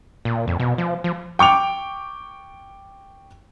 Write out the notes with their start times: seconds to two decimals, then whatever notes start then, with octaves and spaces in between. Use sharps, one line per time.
0.25 A#2
0.48 F2
0.60 B2
0.78 F3
1.04 F3
1.39 G5 C#6 D6 F7